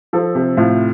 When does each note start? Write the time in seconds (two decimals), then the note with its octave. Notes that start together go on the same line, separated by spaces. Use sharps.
0.13 F3 A4
0.35 C3
0.57 A2 F4